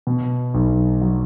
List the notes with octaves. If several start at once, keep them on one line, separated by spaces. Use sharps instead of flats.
B2
B1
F#3